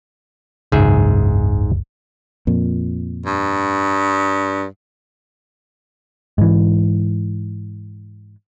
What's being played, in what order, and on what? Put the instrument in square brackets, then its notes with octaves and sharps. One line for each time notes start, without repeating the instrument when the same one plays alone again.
[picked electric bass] F#1 C#2 [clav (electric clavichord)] G#2 G#4 E5
[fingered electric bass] F2 A#2
[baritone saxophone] G2
[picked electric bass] G#2 E3